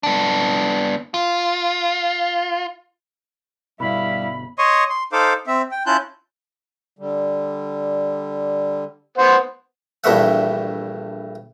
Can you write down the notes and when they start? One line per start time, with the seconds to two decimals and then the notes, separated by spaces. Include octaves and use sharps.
0.03 B3 D4
1.14 F4
3.80 G1 B2 G3 E4 F5 B5
4.58 C#5 D#5 C6 C#6 D#6
4.90 C6
5.12 D#4 A4 C5 F5 D6
5.47 C4 E5
5.71 G5
5.86 C#4 E4 F4 A5 F#6 G6
6.99 D3 G3
9.18 B3 C5 F#5
10.04 A#1 G2 E3 A3 E5 F#5